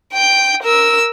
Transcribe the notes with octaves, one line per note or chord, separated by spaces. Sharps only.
G5 G6
A#4 E6